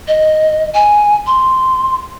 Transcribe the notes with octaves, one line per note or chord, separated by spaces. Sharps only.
D#5
G#5
C6